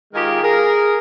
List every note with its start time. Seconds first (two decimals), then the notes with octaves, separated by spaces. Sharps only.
0.14 D#3 G#3 F4 G4 G#4 A#4
0.43 G#4 A#4